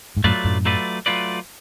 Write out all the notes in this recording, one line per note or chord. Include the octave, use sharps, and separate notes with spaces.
G#2
F#2 A2 F#3 A3 F4 B4 D5
F#2 A2
F#3 A3 F4 B4 D5
F#3 A3 F4 B4 D5